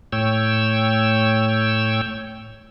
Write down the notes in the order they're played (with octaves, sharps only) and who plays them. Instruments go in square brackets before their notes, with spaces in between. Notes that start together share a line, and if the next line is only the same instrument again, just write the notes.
[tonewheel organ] A2 C#5 G5 E6